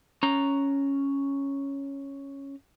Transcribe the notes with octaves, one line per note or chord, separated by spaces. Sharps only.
C#4 A#5